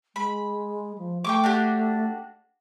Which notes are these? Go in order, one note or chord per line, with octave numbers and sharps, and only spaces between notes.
G#3 B5
F3
A3 G5 C#6 D6
D4 F#4 G4